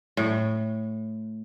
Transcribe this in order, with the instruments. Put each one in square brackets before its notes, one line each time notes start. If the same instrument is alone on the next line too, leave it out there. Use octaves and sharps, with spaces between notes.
[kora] A2